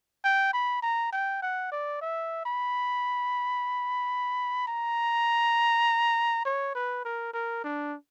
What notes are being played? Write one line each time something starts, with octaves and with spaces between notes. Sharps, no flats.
G5
B5
A#5
G5
F#5
D5
E5
B5
A#5
C#5
B4
A#4
A#4
D4